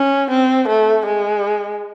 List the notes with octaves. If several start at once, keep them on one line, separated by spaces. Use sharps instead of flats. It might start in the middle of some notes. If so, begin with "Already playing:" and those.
Already playing: C#4
C4
A3
G#3